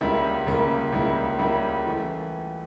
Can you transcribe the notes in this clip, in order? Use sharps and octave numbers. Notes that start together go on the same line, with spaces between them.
C#2 C#3 G3 A#3 E4
C#2 C#3 G3 A#3 E4
C#2 C#3 G3 A#3 E4
C#2 C#3 G3 A#3 E4
E3 A3